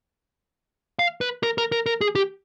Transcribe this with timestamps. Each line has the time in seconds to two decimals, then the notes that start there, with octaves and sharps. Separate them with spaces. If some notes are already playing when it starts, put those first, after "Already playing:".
0.99 F5
1.21 B4
1.43 A#4
1.58 A#4
1.72 A#4
1.86 A#4
2.01 G#4
2.15 G4